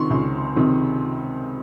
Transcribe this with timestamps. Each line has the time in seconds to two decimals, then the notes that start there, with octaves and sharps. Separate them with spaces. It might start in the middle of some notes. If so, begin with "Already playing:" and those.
Already playing: C3 D#3 C6 C#6
0.10 C#2
0.56 C3 D#3